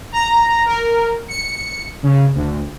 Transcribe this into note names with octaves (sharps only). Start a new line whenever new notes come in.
A#5
A#4
C#7
C#3
D2